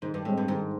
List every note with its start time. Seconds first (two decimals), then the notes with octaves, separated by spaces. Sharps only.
0.02 G#2 D#3
0.14 G2
0.25 A2 G#3 C4
0.37 G2
0.48 G#2 D#3